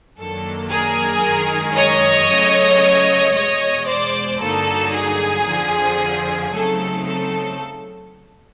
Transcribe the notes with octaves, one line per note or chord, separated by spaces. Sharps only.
F#2 D#3 F#3 A#3 D4 A4
G#4 A#4
F#2 D#3 G#3
C#5 D#5
C#3 F#3 A3
E2 B2 G#3 C#5 D#5
C5 D5
G2 D3 F#3 A#3 D#4 A4
G#4
F2 D3 F3
C#3 F#3 A3 C4 D#4 A4
A4